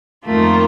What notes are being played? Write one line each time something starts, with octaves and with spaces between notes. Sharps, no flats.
F2 D#3 A3 A#3 F4